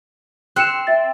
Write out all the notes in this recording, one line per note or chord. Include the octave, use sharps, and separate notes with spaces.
C4 F#6 C#7 E7
E5 A6